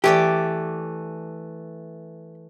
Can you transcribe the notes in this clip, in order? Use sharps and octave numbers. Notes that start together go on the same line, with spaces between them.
E3 A3 G4 D5